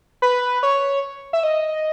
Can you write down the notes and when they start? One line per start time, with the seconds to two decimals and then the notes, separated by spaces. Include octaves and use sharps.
0.22 B4
0.63 C#5
1.33 E5
1.44 D#5